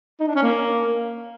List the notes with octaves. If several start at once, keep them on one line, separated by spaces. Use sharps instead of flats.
D#4
D4
C#4
A#3